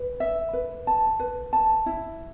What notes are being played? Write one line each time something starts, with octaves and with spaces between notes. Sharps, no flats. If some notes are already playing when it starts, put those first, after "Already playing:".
Already playing: B4
E5
B4
A5
B4
A5
E4